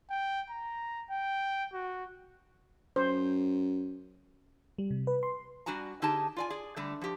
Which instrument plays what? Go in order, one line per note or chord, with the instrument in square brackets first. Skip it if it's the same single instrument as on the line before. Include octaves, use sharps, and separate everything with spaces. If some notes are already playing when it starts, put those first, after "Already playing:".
[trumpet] G5
A#5
G5
F#4
[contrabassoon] F#2 [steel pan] C5
[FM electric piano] G3
C3
B4
C6
[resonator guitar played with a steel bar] G3 D4 F#4 G#5 A#5
D3 D#4 G4 G#4 A5
F4 D5 G#5
G#4 D5
D3 G3 A3
F3 G4